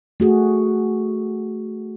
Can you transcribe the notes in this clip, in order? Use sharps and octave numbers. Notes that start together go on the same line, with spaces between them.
A3 F#4 G#4